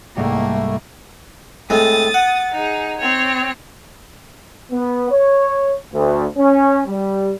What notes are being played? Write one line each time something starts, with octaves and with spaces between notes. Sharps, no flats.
C2 G#2 A3 A#3
A2 G#3 C4 D#6 A6
F#5
D#4 G#4
C4 C#5
B3
C#5
D2
C#4
G3